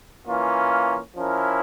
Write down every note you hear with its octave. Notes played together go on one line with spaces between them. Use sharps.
E3 A#3 C#4 F4
F3 C#4 E4 A#4